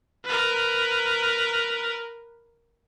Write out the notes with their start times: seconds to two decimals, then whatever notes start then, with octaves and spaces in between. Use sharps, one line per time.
0.25 A#4 B4